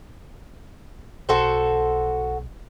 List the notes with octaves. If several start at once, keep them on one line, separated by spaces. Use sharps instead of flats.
B1 F#4 A4 C5